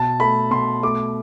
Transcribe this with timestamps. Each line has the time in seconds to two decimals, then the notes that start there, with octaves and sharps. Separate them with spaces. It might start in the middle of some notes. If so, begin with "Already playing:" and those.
Already playing: B2 A5
0.20 A3 B5
0.51 B2 C6
0.83 A3 D6